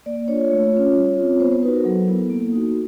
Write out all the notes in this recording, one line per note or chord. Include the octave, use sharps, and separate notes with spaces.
A#3 D5
D4 F4 C#5
A3
C#4 F4
G3
C4 F4
B3 C5
C5
D#4 F#4 B4
A#4
F#3 A4
B3 E4
A#3
D#4 F#4